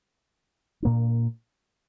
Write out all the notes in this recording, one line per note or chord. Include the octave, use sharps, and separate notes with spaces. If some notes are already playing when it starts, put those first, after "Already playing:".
A#2 A#3 D4